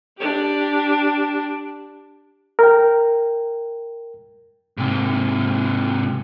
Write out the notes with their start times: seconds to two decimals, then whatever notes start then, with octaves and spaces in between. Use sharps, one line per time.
0.17 D4 G4
2.59 A#4 G5
4.78 G#2 C3